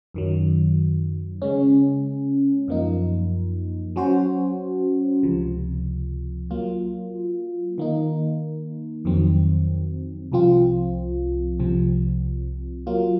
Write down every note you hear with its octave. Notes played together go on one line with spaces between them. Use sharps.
F#2 D#3 F#3
C#3 G#3 C#4
F#2 F3 A#3 D#4
F#3 C#4 F#4 C5
C#2 C3 F3
F#3 A#3 F4
D#3 A#3 D#4
F2 D#3 F#3 C4
C2 C3 F3 C4 F4
C2 C3 F3 C4
F#3 A#3 F4